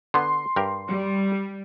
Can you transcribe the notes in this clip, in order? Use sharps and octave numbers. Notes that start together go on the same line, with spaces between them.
D3 B3 C6
G2 G4 A#4
G3